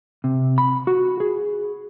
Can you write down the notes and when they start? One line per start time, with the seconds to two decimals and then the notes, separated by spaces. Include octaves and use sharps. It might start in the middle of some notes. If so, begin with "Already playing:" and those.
0.24 C3
0.58 B5
0.87 F#4
1.20 G#4